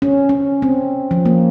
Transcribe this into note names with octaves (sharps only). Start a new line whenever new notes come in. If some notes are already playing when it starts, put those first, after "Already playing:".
C#4
C#4
C4
F3
A#3